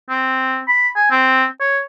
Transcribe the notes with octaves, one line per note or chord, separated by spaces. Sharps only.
C4
B5
G#5
C4
C#5